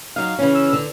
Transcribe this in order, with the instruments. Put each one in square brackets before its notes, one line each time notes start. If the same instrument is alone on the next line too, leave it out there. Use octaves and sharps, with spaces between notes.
[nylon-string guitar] F#3 D#4 [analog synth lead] F5
[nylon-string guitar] C#3 E3 C#4
[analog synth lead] E6
[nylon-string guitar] D3